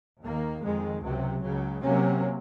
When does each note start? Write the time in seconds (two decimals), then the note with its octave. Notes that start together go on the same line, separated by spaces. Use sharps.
0.23 D#2 D#3 A#3
0.62 F2 D#3 G#3
1.02 C#2 C3 F#3
1.42 C#2 C#3 F#3
1.82 C3 F#3 A#3 C#4